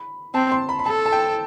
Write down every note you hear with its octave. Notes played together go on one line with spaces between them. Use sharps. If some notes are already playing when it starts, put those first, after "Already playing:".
Already playing: B5
C4 A5
C6
B5
B5
A4 A5
A5
G5